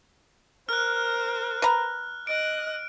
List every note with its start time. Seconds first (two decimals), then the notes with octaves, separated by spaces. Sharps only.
0.69 A#4 C5 F6 F#6
1.62 B4 A#5
2.27 D#5 F#6 D7